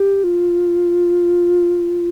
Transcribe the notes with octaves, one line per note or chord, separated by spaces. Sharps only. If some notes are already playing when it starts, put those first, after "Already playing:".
Already playing: G4
F4